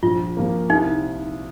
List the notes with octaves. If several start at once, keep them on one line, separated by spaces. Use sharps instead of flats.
A#1 F4
A#2 F3 A#3
C2 D#4